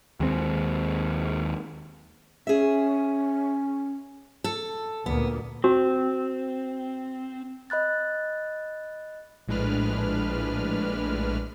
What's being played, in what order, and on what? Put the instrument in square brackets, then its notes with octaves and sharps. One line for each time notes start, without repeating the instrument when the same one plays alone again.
[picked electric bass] D#2 G#3 C4
[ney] C#4 [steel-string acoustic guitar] G#4 E5
[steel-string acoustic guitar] A4
[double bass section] D2 A#2 A#3 [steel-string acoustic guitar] B3
[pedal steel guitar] C4 [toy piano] F#4
[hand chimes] D#5 B5 F#6 A6
[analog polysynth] A#1 A2 G#3 D4 B4 F6